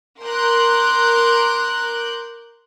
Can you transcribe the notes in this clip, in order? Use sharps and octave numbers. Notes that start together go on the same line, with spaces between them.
A#4 C6 D6 F#6 G6